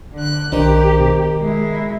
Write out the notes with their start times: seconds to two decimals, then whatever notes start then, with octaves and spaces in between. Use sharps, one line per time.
0.14 D3 F#6
0.52 B1 D#3 D4 G4 C5
1.00 B2
1.41 G#3 E4